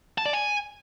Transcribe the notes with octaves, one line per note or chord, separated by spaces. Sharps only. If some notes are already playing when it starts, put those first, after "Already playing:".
A5
D5
G#5